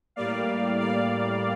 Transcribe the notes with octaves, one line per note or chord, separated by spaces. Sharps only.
A2 G3 A#3 D5 F5
D5 F5